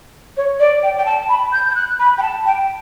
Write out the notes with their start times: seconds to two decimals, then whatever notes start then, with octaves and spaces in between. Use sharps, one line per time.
0.37 C#5
0.60 D5
0.83 G5
0.98 G5
1.06 A5
1.29 B5
1.53 G6
1.71 G6
1.75 F#6
1.99 B5
2.18 G5
2.22 A5
2.46 G5